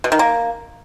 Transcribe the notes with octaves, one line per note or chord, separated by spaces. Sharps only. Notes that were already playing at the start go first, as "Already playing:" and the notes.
B2
D#3
A#3